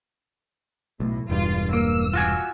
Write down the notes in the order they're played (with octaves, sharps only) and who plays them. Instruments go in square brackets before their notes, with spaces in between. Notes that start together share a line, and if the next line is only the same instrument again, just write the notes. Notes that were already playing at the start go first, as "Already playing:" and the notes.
[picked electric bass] B1 [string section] A2
[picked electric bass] E1 G2 [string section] F4
[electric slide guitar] A#3 [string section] E6
[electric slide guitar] F4 F#4 G#5